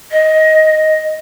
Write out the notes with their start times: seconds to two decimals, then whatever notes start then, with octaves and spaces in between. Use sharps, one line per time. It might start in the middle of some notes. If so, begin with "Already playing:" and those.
0.12 D#5